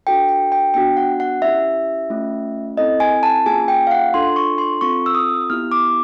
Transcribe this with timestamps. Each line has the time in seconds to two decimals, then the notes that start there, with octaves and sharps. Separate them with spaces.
0.07 D4 F#4 A4 G5
0.29 G5
0.52 G5
0.74 B3 D4 F#4 G5
0.97 F#5
1.20 F#5
1.42 C#4 E4 G4 E5
2.10 A3 C#4 F4
2.77 C4 E4 A4 D#5
3.00 G#5
3.23 A5
3.46 A#3 C#4 F4 G#4 G#5
3.68 G5
3.87 F5
3.91 F#5
4.14 D4 F4 A4 C6
4.36 C#6
4.58 C6
4.81 C4 F4 A4 C#6
5.06 E6
5.15 D#6
5.50 B3 E4 G4 F6
5.72 D6